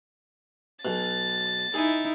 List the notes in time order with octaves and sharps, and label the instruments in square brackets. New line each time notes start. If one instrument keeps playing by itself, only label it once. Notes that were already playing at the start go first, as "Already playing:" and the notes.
[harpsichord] B1 B2 [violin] A6
[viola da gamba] D#4 E4 [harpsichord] G#4 D#5 G#5